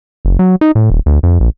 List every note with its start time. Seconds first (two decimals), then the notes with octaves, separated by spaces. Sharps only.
0.25 F#1
0.39 F#3
0.61 D#4
0.75 A2
0.90 D#1
1.06 D2
1.23 F2
1.40 A#1